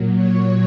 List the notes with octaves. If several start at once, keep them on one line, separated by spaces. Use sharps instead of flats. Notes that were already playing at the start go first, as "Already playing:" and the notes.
Already playing: A#2 F#3
C#5